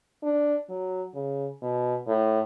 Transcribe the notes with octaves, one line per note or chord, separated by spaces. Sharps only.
D4
F#3
C#3
B2
A2